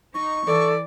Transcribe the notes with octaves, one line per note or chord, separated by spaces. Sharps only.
D#4 C#6
E3 A4 D5